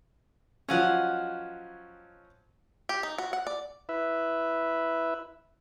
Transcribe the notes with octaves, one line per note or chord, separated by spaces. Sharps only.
F3 F#3 C#4 D#5 F5 F#5
G4
D#4
F#4
F#5
D5
E4 B4 E5